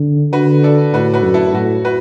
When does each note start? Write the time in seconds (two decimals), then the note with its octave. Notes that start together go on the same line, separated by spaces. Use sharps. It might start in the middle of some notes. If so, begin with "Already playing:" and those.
Already playing: D3
0.33 D3 F#4 B4
0.64 A4 D5
0.93 A2 F#4 B4
1.13 F#4 B4
1.24 F#2
1.34 E4 A4
1.54 A2 F#4
1.85 F#4 B4